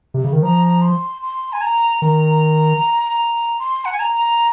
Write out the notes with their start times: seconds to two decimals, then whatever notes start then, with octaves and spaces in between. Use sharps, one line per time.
0.14 C3
0.24 C#3
0.33 D#3
0.43 F3 A#5
0.82 C6
1.22 C6
1.53 G#5
1.61 A#5
2.02 D#3 A#5
3.59 C6
3.85 F#5
3.93 G#5
4.00 A#5